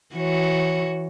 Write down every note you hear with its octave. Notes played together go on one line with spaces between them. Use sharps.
E3 F#4 C#5